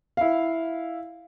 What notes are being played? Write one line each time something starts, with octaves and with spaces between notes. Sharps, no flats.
E4 F5